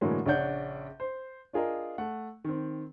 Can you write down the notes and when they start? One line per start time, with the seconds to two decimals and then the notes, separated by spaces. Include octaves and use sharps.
0.01 A2 D3 E3 F#3 G#3 A#3
0.26 A#1 C#3 C#4 D4 F#5 G6
1.00 C5
1.53 D4 F4 G#4 A#4 D#5
1.98 A3 F#5
2.44 D#3 C4